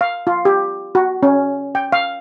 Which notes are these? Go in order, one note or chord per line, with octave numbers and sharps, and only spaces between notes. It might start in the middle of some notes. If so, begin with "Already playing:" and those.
F5
F4
G4
F#4
C#4
G5
F5